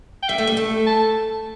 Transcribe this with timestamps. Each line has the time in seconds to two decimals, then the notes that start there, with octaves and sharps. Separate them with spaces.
0.23 G5
0.29 G3 E5
0.38 A3
0.47 G3
0.57 A3
0.87 A5